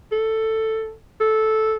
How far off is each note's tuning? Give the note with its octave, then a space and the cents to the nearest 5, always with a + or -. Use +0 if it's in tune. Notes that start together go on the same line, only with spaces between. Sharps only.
A4 +10
A4 -10